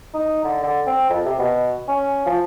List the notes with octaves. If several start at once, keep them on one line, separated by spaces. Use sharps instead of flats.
D#4
D3
D3
C4
F2
C3
B2
C#4
F3